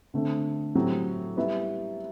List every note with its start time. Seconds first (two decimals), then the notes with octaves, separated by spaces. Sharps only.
0.14 D3 A3 C4
0.75 A2 F#3 C4 G4
1.37 G3 B3 E4